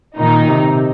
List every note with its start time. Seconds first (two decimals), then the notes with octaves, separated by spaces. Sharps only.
0.17 A#2 D#3 D#4
0.49 C3